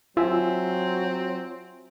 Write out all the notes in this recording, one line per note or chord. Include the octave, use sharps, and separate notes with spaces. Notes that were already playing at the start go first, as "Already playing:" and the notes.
F#3 C4 F4 E5 G#5